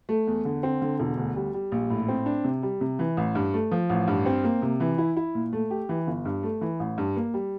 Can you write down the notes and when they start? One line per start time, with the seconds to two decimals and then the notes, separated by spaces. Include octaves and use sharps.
0.09 A3
0.27 E2
0.45 D3
0.63 C4
0.82 D3
1.00 E1
1.18 D2
1.36 G3
1.54 G3
1.72 A#1
1.90 A2
2.08 C4
2.26 D4
2.44 C3
2.63 G3
2.81 C3
2.99 E3
3.17 A1
3.35 G2
3.54 A3
3.71 F3
3.90 A1
4.08 G2
4.26 C4
4.44 A#3
4.62 C3
4.80 E3
4.98 E4
5.17 E4
5.35 A#2
5.53 A3
5.71 G4
5.89 E3
6.07 G1
6.25 G2
6.43 A3
6.61 E3
6.80 A1
6.98 G2
7.16 A#3
7.34 G3